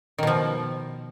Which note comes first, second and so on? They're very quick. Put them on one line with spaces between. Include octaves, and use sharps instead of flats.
D#3 B2 F3